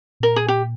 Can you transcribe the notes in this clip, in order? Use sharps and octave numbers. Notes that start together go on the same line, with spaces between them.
A#2 A#4
G#4
G4